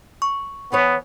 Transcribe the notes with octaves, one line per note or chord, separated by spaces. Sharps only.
C#6
E3 B3 B4 C#5